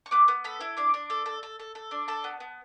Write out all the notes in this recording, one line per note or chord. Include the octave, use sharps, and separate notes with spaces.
C#6
B3 D6
B3
A4 B5
E4
D4 D6
D4
A4
A4
A4
A4
A4
D4
A4 A5
B3
B3